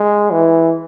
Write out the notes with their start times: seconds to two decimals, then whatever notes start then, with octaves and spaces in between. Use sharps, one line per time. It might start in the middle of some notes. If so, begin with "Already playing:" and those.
Already playing: G#3
0.31 E3